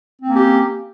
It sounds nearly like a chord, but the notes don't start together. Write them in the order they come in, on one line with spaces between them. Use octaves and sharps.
C4 A#3 C#4 G4